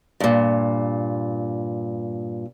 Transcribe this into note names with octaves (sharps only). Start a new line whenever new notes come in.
G2 A#2